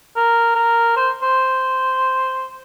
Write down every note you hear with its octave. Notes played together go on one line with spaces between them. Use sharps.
A#4
A#4
C5
C5